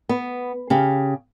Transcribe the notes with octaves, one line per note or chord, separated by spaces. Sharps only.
B3
C#3 G4 F5